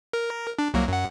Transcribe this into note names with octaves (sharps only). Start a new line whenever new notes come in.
A#4
D4
C2 F#3 A#3
F#2 F#5